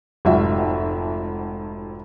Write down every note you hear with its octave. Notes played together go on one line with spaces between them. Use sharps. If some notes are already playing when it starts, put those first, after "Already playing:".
F1 F2 G#2 F#4 E5